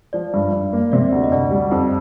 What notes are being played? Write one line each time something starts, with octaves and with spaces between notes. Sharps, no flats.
F3 D5
G2
G2
A#3
C3 D5
D2
D#5
D2 D5
G3
F2 C5